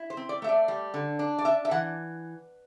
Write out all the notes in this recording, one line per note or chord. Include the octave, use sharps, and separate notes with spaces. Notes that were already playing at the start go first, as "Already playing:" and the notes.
Already playing: E4
C5
C4
D5
A3 E5
D5
G3
D3
D4
D5
D4 E5
E5
E3 F#5